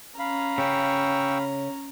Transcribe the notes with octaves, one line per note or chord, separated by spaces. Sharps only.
C#4 F5 A#5 B5
C#3 G5 C#6 E6